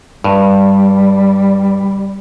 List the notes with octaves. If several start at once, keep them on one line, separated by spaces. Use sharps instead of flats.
G2 G3